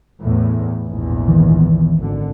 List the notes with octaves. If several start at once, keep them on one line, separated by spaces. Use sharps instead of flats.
E2 A2
A#1 E2 G#2
D#3 E3
G#1 D3